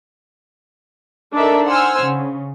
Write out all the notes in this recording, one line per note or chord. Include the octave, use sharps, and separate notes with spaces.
D4 D#4 A4 A#4 D5 E5
C5 F#5 G#5 E6 F6
C#3